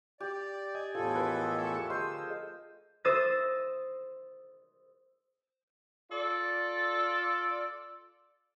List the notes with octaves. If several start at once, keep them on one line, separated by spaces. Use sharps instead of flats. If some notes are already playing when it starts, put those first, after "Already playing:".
G4 D5
D#5 G#5
E2 A2 F3 A4
A#4 B4 C6 D6
A3 G#5 B5 C#6 D6 E6
D3 G#4 C5 D#5 F5 C6 E6
C5 D#6 E6 A6 A#6
F4 A4 D5